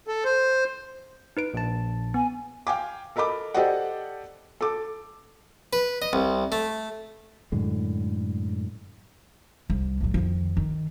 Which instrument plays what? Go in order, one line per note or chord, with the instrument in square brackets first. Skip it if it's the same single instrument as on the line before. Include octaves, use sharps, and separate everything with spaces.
[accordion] A4
C5
[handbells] D#4 B4 D7
[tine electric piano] A#1 A5
[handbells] B3 [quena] G#5
[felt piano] F5 G5 G#5 D6
A4 A#4 D#5 B5 D6
G4 A4 C5 D5 D#5 F#5
A4 D6
[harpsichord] B4
D#5
C2
A3
[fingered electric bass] F#2 A2 D3 G#3
[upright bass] C2
A2 F#3
F2 D#3
D#3